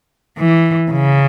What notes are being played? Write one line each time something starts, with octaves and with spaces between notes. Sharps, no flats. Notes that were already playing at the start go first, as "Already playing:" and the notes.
E3
C#3